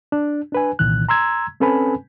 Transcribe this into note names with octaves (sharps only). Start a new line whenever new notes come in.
D4
D4 B4 G#5
C2 A#2 D#3 E3 F#6
A#5 C6 E6 G#6
C4 C#4 A4 B4 G#5 B5